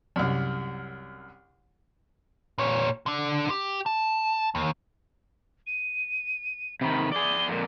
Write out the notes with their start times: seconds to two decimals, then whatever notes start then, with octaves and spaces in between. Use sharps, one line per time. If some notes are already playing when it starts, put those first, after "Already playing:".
0.16 C2 F#2
2.58 A#2 C#5
3.06 D3 D4
3.50 G4
3.86 A5
4.55 D#2
5.66 D#7
6.81 C3 D#3 B5
7.12 G#4 D5 G7
7.48 F2 A#2